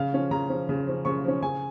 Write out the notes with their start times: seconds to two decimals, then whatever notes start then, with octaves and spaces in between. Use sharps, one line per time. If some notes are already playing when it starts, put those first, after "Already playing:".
Already playing: C#3 F5
0.13 F3 C#4
0.31 C#3 A#5
0.50 F3 C#4
0.69 C#3
0.87 F3 C#4
1.05 C#3 C#6
1.24 F3 C#4
1.42 C#3 G#5